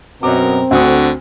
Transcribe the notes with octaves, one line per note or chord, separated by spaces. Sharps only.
F#2 B2 C4 A#4 D6
D2 D3 F#4 D#6